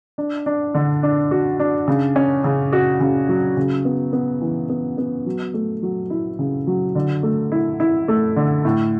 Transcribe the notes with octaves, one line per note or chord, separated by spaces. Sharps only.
D4
D4
D3
D4
F#4
D4
C#3
C#4
C#3
F#4
C#3
F#3
C#3
B3
B3
E3
B3
B3
F#3
A3
F#3
E4
C#3
F#3
D3
A3
E4
E4
A3
D3
A2